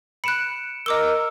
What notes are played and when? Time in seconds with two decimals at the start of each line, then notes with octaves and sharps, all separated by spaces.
0.24 B5 F#6 C#7 D7 E7
0.86 A#4 D#5 D6 E6 G7